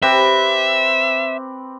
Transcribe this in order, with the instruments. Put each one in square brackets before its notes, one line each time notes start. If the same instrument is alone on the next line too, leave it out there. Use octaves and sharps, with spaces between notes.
[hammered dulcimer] C4 G4 B4 [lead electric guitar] E5